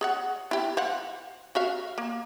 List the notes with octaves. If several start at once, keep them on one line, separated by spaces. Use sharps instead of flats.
G#4 C#5 F#5
E4 G4
C5 F5 F#5
F#4 E5 F5
A#3